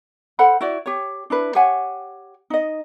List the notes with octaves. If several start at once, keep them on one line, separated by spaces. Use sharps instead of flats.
A4 C5 F#5 B5
E4 F#4 D5
G4 C#5
D4 E4 B4
G4 C#5 F#5 G#5
D#4 D#5